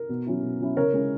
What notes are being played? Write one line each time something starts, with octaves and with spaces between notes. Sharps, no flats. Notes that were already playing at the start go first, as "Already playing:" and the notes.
Already playing: A#4
B2
F#3 C#4 E4
B2
F#3 C#4 E4
C#3 A#4 C#5
G#3 C#4 E4